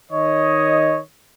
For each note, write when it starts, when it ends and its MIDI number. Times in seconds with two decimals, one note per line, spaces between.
0.11 0.99 51
0.11 0.99 73
0.11 0.99 75